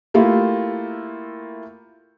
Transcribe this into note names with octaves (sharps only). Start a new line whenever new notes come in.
A3 A#3 E4 F4 G4